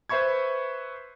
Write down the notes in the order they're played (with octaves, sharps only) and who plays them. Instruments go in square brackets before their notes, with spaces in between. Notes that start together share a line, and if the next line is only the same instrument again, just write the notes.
[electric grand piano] B4 C5 E5 B5 C#6 G#6